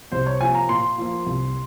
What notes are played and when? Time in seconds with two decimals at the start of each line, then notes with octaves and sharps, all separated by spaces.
0.12 C2 C5
0.26 C#5
0.41 C3 F3 A#3 G#5
0.55 A#5
0.69 A#2 C6
0.98 F3 A#3
1.26 C2